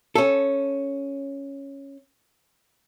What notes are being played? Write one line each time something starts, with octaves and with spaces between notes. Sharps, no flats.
C#4 A4